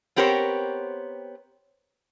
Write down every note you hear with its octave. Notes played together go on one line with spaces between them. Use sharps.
B3 C4 G4 A#4 C5 C#5